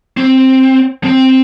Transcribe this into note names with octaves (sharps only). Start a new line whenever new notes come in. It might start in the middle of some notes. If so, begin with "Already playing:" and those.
C4
C4